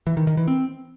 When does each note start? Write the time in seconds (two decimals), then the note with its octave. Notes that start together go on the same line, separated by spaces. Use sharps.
0.07 E3
0.17 D#3
0.27 D#3
0.37 E3
0.48 C4